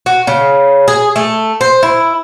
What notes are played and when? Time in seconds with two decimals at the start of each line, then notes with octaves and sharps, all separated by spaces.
0.06 F#4
0.27 C#3
0.88 G#4
1.16 A3
1.61 C5
1.83 E4